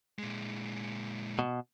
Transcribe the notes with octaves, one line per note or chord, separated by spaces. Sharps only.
A#2 G#3
B2